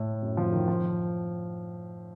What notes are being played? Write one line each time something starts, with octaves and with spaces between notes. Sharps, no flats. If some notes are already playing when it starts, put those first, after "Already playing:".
Already playing: A2
F#2
F3
D#3
F3